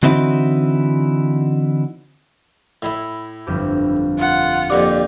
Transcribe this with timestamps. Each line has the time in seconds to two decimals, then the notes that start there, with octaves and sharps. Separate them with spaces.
0.03 D3 E3 C4 D#4 E4 F#4
2.82 A2 E4 E5
3.47 G1 F2 G4
4.17 F4 F#5
4.70 F2 A#2 G4 D5